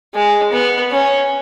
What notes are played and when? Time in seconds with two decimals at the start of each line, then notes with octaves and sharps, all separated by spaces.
0.14 G#3
0.52 B3
0.91 C#4